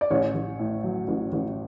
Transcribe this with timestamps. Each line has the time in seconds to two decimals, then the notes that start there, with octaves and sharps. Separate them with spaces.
0.01 D5
0.10 A1 C#5
0.35 A1
0.59 A2
0.84 F#3
1.08 A1
1.32 A1